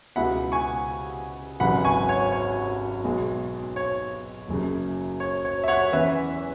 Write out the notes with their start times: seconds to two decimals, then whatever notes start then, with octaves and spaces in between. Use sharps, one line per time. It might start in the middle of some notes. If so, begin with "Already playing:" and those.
0.16 C#2 B2 G#3 E4 F#5 B5
0.52 G#5 C#6
1.60 G#1 F#2 C#3 E3 G#3 F#5 B5
1.85 G#5 C#6
2.09 C#5
2.32 C#5
3.04 B1 B2 G#3
3.76 C#5
4.48 F#1 F#2 C#3
5.20 C#5
5.45 C#5
5.64 E5
5.68 C#5 F#5
5.93 E2 E3 C#4 B4 E5